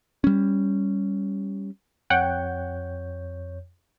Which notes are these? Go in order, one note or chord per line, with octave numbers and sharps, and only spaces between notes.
G3 C#4
F2 C#5 F#5 G5 G6